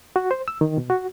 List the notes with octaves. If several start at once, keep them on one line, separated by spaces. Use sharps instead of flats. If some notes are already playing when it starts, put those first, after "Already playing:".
F#4
C5
E6
D#3
B2
F#4